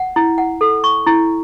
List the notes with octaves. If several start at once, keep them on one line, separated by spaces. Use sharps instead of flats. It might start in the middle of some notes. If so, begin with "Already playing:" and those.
Already playing: F#5
E4
F#5
A4
C#6
E4